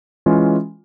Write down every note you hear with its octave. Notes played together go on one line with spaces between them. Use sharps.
E3 G#3 C#4 F4